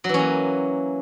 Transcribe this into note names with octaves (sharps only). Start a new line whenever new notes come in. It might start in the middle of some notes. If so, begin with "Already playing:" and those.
E3 F#3 A#3 C#4